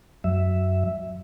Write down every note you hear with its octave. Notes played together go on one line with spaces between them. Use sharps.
F#2 F#3 E5